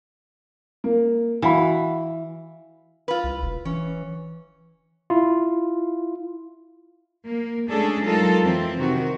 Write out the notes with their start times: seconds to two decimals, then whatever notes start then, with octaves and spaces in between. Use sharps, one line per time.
0.84 A#3
1.42 E3 F#4 F5 B5
3.08 F4 B4
3.24 C2
3.42 E1
3.65 E3 C#4
5.10 E4 F4
7.25 A#3
7.69 G#3 A3 C#4 D4 G#4 A4
8.04 F#3 G#3 D#4 F4 A4 A#4
8.41 F2 E3 C4
8.78 C3 D#3 F#4